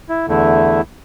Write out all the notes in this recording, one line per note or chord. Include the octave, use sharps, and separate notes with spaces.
E4
E2 D3 A3 E4